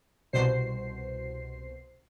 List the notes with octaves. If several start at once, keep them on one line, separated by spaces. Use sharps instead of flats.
C2 B2 C5 C7